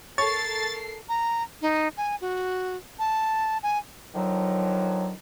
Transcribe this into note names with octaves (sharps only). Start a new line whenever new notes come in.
A4 A#4 C#5 A6 C7
A#5
D#4
G#5
F#4
A5
G#5
D3 D#3 F3 F#3